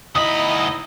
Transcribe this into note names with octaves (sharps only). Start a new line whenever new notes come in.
D2 D#4 E4 D#5 B5 D#6